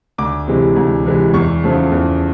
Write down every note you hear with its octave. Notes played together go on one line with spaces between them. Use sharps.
D2 D6
C3 E3 G#3
D2
C3 E3 G#3
E2 C#6
C#3 F3 A3
E2